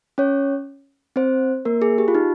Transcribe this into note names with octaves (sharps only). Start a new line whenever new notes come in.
C#4 C#5
C4 C5
A#3 A#4
G#4
G4
F4
D#4